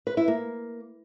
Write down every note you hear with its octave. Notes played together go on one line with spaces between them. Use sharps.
B4
E4
A#3